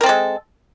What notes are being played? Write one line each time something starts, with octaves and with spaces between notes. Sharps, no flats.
G#3 C4 A4 A#4